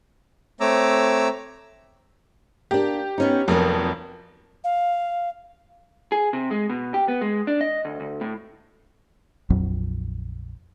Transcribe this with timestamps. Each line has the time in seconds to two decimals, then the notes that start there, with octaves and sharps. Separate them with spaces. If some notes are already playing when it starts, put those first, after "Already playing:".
0.60 A3 C4 C#5 A#5 D6 E6
2.71 A#3 D4 G4
3.18 B3 C#4 D#4
3.48 F1 F2 F#3 A#3 G#5
4.64 F5
6.12 G#4
6.33 C3
6.51 G#3
6.69 B2
6.94 G4
7.08 B3
7.21 G#3
7.47 D4
7.61 D#5
7.85 D2
8.00 D2
8.21 A2
9.50 A#1 F2 F#3